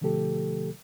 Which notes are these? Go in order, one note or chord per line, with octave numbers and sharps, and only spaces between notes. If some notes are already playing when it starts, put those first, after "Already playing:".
B2 D3 F3 A3 G4 A4